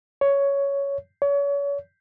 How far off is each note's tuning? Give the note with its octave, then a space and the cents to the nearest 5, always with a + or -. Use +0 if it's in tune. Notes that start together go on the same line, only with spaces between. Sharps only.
C#5 +10
C#5 +35